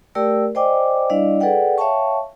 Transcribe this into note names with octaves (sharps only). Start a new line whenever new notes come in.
A3 G4 A#4 D5 G5 E6
C5 D5 D#5 G5 G#5 D6
G3 D4 E4 D5 D#5 F5
G#4 A4 B4 D5 F#5 G5
C#5 E5 F5 G5 A5 C#6